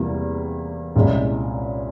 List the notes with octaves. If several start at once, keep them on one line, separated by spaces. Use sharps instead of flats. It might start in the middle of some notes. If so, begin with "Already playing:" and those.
Already playing: E2 C3 G3 A#3 E4
C2 A#2 G#3 C#4 E4